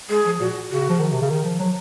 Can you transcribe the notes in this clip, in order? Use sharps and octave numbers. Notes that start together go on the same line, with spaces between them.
G#3 G#4
F3
A#2 F#4
C#3 F#4
F3
D#3
C3
C#3
D#3
F3
F#3